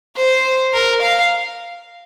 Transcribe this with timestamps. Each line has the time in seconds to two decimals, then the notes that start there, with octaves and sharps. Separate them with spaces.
0.16 C5
0.73 A#4
1.02 F5